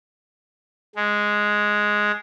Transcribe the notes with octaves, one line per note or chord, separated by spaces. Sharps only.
G#3